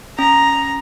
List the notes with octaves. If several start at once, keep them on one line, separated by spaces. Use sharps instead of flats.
C#4 A#5